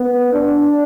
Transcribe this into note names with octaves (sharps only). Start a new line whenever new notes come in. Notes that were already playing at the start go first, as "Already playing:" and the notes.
Already playing: B3
D4